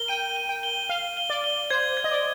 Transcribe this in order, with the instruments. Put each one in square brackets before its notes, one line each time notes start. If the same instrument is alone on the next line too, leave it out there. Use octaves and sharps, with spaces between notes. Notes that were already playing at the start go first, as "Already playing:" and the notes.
Already playing: [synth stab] A#4 [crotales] G7
[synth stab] G5 [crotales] D#7
[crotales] G7
[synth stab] G5
[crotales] G7
[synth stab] F5 [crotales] G7
[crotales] G7
[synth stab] D5
[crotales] G7
[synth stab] C5 [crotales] G#6
[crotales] G#6
[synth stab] D#5
D5